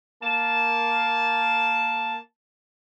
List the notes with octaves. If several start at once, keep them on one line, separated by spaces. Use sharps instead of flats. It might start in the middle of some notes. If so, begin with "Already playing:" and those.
A#3 A5